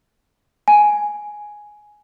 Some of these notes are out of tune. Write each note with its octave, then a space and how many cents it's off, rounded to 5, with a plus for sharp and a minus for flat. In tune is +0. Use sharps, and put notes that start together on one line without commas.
G#5 +5